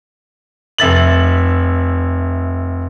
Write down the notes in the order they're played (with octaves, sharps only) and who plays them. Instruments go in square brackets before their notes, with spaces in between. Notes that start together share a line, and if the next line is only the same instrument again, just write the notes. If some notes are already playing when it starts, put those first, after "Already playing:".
[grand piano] F1 E5 A6 F#7